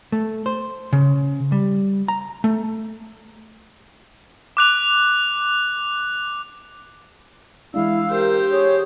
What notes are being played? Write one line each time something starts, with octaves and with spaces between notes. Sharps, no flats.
A3
C5
C#3
G3
A#5
A3
D6 F#6 F7
E3 G#3 D4 E4 F5 E6
G4 A#4 C5
G#4 C#5